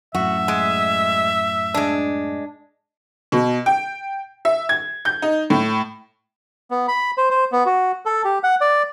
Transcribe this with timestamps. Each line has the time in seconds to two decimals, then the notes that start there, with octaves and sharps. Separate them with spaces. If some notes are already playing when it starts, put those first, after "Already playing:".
0.15 F#2 A2 F#4 E5
0.48 G#3
1.74 G#3 D4
3.32 B2
3.66 G5
4.45 E5
4.69 G#6
5.05 G6
5.22 D#4
5.50 A2
6.71 B3
6.88 B5
7.17 C5
7.30 C5
7.52 B3
7.66 F#4
8.06 A4
8.24 G4
8.43 F#5
8.61 D5